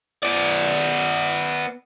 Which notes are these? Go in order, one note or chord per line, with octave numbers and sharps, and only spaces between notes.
B3 D5